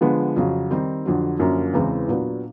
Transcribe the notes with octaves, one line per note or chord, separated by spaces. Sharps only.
D3 F3 G#3 B3
F2 C#3 F#3
D#3 G3 C4 D#4
F2 D3 F#3
F#2 D3 F3 A#3 C#4
E2 C#3 E3 G#3 C4
A#2 F#3 B3 D4